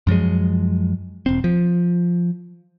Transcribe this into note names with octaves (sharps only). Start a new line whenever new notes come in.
F#2 F3 F#3 G#3
E1 C4
F3